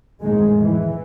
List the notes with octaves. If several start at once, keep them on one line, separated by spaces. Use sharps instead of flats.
F2 A2 D#3 G#3
E3